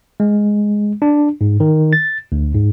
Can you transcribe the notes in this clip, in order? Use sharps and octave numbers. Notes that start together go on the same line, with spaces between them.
G#3
D4
G#2
D#3
A6
D2
G#2